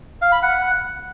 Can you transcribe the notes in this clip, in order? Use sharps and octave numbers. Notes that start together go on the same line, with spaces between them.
F5
B5
F#5